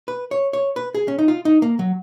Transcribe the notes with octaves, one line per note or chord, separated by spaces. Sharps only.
B4
C#5
C#5
B4
G#4
C#4
D#4
F4
D#4
A#3
F#3